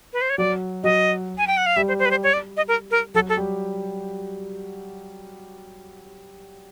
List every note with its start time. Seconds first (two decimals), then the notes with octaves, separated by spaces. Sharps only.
0.13 B4
0.21 C5
0.30 C#5
0.38 F#3 F#4 D5
0.84 F#3 F#4 D#5
1.38 G#5
1.47 G5
1.57 F#5
1.66 F5
1.76 G3 G4 E5
1.88 C5
1.99 C5
2.06 B4
2.11 C5
2.23 C#5
2.33 D5
2.57 D#5
2.68 A#4
2.91 A#4
3.14 F#3 F#4 A4
3.29 A4
3.37 G3 G4